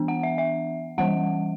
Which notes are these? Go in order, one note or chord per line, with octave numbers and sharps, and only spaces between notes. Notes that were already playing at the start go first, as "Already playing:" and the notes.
Already playing: E3 B3 D4
F#5
E5
E5
E3 G3 C#4 F#5